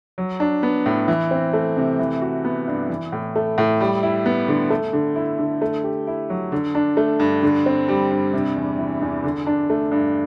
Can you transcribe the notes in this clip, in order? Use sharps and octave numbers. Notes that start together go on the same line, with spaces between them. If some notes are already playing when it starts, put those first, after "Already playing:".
F#3
D4
B3
A2
E3
C4
A3
C3
E3
F#4
B3
G2
E3
A2
A3
A2
G3
E4
B3
D3
A3
D3
E4
D3
A3
G4
E4
F#3
D3
D4
A3
G2
D3
C4
G3
G2
C3
E2
E3
E2
D3
D4
A3
G2